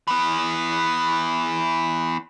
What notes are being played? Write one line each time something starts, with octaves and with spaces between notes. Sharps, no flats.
E3 B3